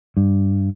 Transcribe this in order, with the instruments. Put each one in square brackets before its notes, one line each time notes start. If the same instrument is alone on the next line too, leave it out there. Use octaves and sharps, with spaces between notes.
[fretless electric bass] G2